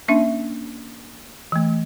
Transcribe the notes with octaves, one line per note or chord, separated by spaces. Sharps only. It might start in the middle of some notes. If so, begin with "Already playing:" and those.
A#3 C#4 D4 E5
E3 A3